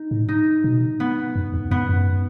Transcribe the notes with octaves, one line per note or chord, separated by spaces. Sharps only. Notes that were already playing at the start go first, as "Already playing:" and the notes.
Already playing: D#4
A2
D#4
B2
B3
F#2
E2
F#2 B3
F#2